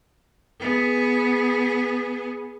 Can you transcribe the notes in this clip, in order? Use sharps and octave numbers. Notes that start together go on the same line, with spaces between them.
B3 G#4